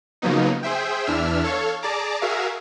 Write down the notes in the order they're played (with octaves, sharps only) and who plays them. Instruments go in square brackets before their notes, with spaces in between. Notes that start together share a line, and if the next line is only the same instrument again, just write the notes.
[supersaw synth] C#3 F3 F#3 A#3 B3 D#4
G#4 C5 E5 G5
E2 E3 D4 E5 E6 F6
A4 C#5 F5 C#6
G#4 D5 A5 A#5 D6
F#4 G#4 A#4 E5 F5